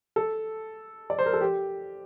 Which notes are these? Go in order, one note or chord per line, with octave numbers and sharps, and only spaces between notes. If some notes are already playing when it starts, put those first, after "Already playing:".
A4
D5
C5
A#4
A4
G4